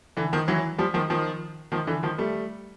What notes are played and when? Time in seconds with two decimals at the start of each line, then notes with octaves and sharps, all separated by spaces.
0.17 D3 E3
0.33 D#3 F3
0.48 E3 F#3
0.78 F3 G3
0.94 D#3 F3
1.10 D#3 F3
1.72 D#3 F3
1.87 D3 E3
2.03 D#3 F3
2.18 G3 A3